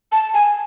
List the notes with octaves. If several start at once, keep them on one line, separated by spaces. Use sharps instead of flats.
A5
G#5